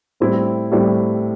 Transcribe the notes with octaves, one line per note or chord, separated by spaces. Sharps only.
A2 G3 C4 E4
A2 G3 C4 E4